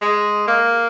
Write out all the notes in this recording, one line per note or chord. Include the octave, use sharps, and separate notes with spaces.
G#3
A#3